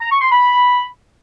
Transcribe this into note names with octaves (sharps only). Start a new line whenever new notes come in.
A#5
C#6
C6
B5